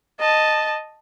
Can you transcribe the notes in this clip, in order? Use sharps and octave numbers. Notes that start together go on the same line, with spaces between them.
D#5 A5